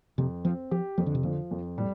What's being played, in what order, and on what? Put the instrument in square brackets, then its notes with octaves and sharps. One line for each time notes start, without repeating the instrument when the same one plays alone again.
[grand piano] F2 [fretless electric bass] C3
[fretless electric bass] F3 [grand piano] C4
[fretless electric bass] F3 [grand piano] G4
[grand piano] F2 [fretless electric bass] F3
[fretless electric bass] D3
C3
[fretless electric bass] D3 [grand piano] F3
[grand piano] F2
[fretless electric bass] A2 [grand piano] G3